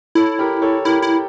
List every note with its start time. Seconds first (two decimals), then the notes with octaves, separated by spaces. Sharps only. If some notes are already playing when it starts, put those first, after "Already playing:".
0.15 E4 A4 C#5
0.39 G4 A#4
0.62 A4 C#5
0.85 E4 G4 A#4
1.02 E4